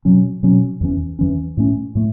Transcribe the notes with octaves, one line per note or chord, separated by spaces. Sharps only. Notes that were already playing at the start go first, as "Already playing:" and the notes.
B2 F#3 C#4
B2 F#3 C#4
E2 E3 C#4
E2 E3 C#4
A2 A3 C#4
A2 A3